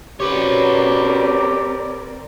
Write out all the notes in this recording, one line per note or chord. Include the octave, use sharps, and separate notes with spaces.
C4 C#4 F#4 G4 A#4 B4 C#5 D5